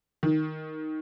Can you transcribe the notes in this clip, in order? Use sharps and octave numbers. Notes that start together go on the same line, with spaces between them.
D#3